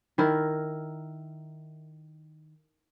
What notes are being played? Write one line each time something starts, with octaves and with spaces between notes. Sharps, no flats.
D#3 E4 A#4